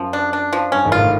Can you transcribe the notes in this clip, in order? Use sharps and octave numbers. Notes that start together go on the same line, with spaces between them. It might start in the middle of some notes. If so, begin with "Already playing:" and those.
Already playing: F#2 F3
D4
D4
F3
G2 C#4
G#1 G#2
F4
A2